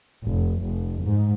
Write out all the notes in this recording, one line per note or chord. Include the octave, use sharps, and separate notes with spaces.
F1
F1
G#2